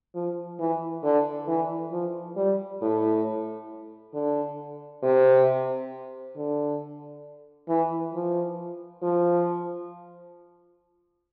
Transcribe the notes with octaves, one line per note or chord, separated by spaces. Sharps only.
F3
E3
D3
E3
F3
G3
A2
D3
C3
D3
E3
F3
F3